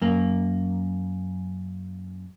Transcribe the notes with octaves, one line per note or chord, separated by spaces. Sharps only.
F#2 A#3